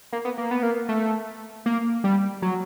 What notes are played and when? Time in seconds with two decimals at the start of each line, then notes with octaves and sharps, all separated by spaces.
0.13 A#3
0.25 B3
0.38 A#3
0.51 B3
0.63 A#3
0.89 A3
1.66 A#3
2.04 G3
2.42 F#3